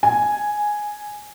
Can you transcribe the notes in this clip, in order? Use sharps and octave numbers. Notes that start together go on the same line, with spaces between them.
G#5